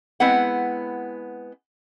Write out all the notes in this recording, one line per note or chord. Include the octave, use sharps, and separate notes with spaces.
G#3 B3 C4 E4 F#5